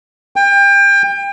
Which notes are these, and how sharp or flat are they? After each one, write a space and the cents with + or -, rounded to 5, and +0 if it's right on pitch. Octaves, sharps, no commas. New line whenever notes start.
G5 +30